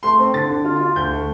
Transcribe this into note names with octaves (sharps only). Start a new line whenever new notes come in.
A3 C6
C4
D3 A6
D3
F4
F4
D2 G6
A3